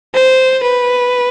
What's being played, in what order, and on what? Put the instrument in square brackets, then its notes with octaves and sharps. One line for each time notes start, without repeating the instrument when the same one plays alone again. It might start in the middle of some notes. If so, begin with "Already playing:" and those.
[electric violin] C5
B4